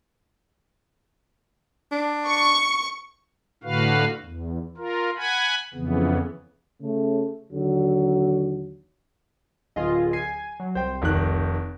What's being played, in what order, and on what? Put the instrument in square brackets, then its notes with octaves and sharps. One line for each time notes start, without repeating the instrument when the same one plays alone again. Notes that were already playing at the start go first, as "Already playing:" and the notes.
[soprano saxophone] D4
[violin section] C#6
[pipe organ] A2 D3 F#4 B4 F5
E2
F4 A#4
F#5 G#5 B5
F2 C#3 E3 B3
[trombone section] C#3 A3
D#2 D3 F#3
[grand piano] D1 [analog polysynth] F4 G#4 D#5
[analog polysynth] G#5 [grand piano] C7
[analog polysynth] F#3
[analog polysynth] C2 [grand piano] C5 G5
[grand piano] F1 D#3 F#6